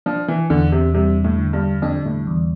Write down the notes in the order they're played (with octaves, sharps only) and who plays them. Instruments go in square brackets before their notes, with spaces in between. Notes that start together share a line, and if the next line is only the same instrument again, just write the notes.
[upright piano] F3 [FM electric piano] D4
[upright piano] E3
[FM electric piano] E2 [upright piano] D3
[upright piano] C3
[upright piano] C3 [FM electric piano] G3
[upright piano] A2
[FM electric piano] D3
[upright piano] G2
[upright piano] F2 [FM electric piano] D4
[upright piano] A2
[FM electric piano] E2